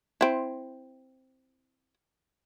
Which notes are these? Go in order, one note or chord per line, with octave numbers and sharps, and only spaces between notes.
C4 E4